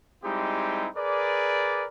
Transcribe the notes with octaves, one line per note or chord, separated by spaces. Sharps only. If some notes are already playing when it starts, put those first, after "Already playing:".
G3 G#3 C4 D#4 E4 G4
G#4 A#4 B4 D5